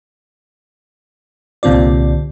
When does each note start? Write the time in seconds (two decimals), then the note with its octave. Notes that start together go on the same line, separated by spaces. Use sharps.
1.63 C2 A#2 D3 C4 F4 D5